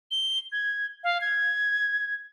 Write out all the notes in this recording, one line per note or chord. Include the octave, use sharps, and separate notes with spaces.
G7
G#6
F5
G#6